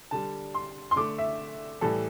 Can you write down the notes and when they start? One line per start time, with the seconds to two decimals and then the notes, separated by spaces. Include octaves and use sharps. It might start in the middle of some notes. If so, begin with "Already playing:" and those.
0.11 D3 G3 A5
0.54 C6
0.91 C6
0.96 D3 A3 D6
1.18 E5
1.81 A2 E3 G3 A4